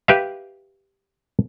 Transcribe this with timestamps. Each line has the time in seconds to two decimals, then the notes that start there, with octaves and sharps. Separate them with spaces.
0.08 G4 B4 E5 F5